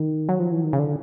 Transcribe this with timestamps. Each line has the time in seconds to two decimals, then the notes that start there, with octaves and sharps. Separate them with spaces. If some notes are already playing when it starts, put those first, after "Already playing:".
Already playing: D#3
0.29 F#3
0.40 F3
0.52 E3
0.63 D#3
0.73 C#3
0.79 D3